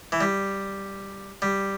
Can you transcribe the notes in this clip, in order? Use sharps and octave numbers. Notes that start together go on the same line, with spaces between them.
E3
G3
G3